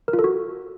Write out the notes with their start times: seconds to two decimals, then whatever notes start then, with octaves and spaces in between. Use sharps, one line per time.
0.08 A#4
0.13 F4
0.19 A4
0.24 F#4